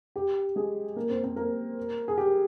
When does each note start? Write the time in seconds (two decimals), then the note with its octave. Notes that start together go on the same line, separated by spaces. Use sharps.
0.16 G4
0.56 G#3 G#4
0.96 A#3 A#4
1.09 C4 C5
1.23 C4 C5
1.36 A#3 A#4
2.08 G#4
2.18 G4